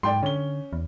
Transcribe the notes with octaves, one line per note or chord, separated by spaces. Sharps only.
G#2 D5 G5 C6
D3 C#4 G7
E2